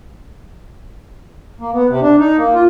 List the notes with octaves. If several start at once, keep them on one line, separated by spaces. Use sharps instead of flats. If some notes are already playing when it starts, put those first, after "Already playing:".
A#3
B3
C3
D4
D#4
A#3
F4